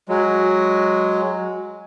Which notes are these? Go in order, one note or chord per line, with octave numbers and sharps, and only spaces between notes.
F#3 G#3